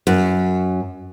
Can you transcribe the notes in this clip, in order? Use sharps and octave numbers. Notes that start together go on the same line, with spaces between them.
F#2